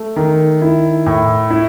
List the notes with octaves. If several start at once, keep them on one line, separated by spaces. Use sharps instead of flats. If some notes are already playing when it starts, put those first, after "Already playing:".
Already playing: A3
D#3
E4
A2
E4